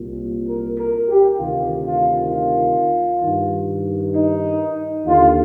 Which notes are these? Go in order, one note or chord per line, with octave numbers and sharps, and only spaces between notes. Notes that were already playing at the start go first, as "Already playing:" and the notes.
Already playing: C2 A#2
A#4
A#4
G4
D2 C3 D#3 F4
F4
F4
G2 D#3
D#4
D#2 D3 F4